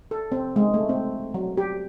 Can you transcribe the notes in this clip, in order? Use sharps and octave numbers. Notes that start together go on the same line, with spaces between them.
A4
C4
G#3
A3
C4
F#3
G4